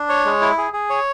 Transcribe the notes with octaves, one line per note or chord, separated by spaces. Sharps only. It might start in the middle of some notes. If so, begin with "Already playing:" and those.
Already playing: D4
C#5
G#3
E4
G#4
G#4
C#5